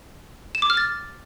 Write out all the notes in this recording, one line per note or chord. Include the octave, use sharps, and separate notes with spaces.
E7
D6
F6
A6